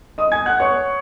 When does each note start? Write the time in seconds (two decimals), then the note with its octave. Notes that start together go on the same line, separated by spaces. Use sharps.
0.18 D#5 D#6
0.32 G#5 G#6
0.46 F#5 F#6
0.60 C#5 C#6